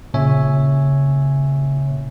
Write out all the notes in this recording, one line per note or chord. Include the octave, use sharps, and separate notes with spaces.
A#2 C#3 C#5 E5 G#5